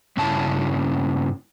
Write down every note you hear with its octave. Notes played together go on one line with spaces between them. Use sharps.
G2 C#3 C#4 E4 A5